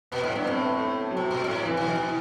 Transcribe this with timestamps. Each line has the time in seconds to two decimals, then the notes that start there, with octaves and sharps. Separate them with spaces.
0.12 B2 B3
0.23 A2
0.29 B3
0.35 G2
0.45 A2 C4
0.61 B3
0.78 A3
1.11 F#3
1.17 C3
1.31 B2
1.44 A2
1.65 E3
1.77 B2
1.88 E3